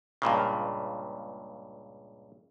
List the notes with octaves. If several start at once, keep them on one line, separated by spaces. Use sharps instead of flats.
C#2 G2 A#2 C#3